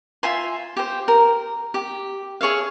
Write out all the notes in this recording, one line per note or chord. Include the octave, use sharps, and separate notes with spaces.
F4 E5 G#5 C6
G4 C5
A#4
G4
G#4 C#5 E5 F5